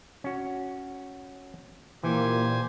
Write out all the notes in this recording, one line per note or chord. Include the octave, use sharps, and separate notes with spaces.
C#4 F#4
A#2 E3 A#3 G4 C5 G#5